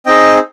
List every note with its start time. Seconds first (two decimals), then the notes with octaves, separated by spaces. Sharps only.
0.06 C4 D#4 G#4 D#5 G5